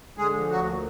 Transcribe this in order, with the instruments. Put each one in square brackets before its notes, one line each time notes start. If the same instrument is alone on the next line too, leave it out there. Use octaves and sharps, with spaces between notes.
[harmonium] D3 [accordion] G#3 G#4
[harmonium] F3
[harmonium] D2 [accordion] F#3 F#4
[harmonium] A#3